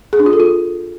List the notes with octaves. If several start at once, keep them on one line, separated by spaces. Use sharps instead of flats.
G#4
D4
F4
A4
F4